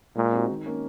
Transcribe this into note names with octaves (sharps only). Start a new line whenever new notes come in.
A#2 G#3
C4 D#4 F#4
D#3
A#3 C#4